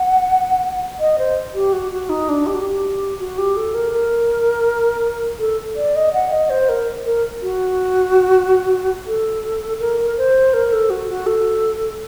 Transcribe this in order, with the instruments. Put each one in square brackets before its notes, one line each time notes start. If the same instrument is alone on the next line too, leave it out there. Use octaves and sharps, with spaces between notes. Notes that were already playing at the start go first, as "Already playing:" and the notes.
Already playing: [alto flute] F#5
D#5
C5
G4
F#4
F#4
D#4
D4
G4
F#4
G4
F#4
G4
A4
A#4
A#4
A4
D5
D#5
F#5
D#5
C5
A#4
A#4
F#4
A4
A#4
C5
A#4
A4
F#4
F#4
A4